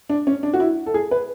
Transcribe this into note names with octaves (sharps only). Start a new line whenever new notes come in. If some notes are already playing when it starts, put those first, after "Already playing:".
D4
C#4
D4
F#4
E4
A4
G#4
B4